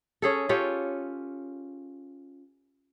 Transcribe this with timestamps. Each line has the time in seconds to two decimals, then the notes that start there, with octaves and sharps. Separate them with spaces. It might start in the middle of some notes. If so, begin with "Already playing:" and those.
0.22 C#4 G#4 A4
0.49 C#4 F4 G4 A4